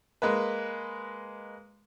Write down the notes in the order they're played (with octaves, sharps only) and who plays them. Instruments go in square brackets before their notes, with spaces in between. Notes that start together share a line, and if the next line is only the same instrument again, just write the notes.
[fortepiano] G#3 A#3 B4